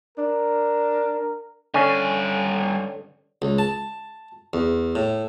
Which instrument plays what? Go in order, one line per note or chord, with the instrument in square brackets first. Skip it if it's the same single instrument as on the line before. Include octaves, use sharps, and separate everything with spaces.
[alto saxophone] D4 [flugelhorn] A#4
[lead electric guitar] G2 G#5 [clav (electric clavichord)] D3 C#4
[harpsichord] C#2
A5
E2
A2